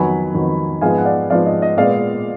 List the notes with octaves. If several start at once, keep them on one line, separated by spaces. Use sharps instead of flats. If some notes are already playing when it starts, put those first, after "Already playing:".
Already playing: F2 D#3 F#3 B3 G#5 B5
F2 D#3 F#3 B3
G#2 F3 G#3 B3 F5 G#5
F#5
D5 F5
G#2 F3 G#3 B3 D5 F5
D#5
D#5
A#2 G#3 B3 D5 F5